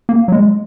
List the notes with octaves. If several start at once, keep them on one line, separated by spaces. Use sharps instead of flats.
A#3
F#3
G#3